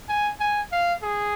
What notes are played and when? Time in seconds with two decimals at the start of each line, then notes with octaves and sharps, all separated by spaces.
0.09 G#5
0.40 G#5
0.72 F5
1.03 G#4